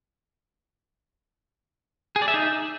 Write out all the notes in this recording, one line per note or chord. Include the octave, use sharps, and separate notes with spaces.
G#4
D5
E5
D#4